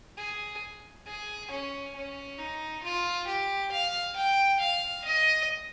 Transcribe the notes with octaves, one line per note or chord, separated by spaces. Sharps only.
G#4
G#4
C#4
C#4
D#4
F4
G4
F5
G5
F5
D#5